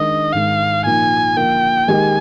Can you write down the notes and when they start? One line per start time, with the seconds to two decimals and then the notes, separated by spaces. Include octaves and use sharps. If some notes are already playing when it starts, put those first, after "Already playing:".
Already playing: D#3 G#3 D4 D#5
0.33 G#2 D#3 G#3 F5
0.85 A#2 F3 A#3 D#4 G#5
1.36 D3 F3 A#3 G5
1.88 D#3 G#3 D#4 G4 G#5